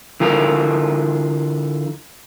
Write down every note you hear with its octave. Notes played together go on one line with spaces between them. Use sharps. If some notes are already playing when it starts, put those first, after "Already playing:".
D3 E3 F4 A#4